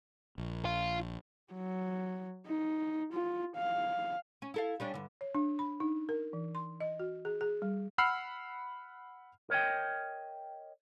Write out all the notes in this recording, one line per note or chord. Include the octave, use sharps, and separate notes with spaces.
A#1
F4
F#3
D#4
F4
F5
C#4
E4 A4 F5
G3 C#4 D4
G2 D3
C#5
D4
B5
D#4
A#4
E3
C6
D#5
F#4
G#4
G#4
G3
F#5 B5 E6 F6 C7
A#4 C#5 D#5 G5